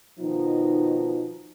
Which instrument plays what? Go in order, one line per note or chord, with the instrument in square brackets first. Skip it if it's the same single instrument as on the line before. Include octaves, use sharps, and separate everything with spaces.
[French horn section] B2 D#3 F3 D#4